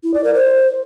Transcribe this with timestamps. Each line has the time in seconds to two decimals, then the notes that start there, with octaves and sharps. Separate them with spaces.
0.03 E4
0.14 D5
0.24 A#4
0.34 C5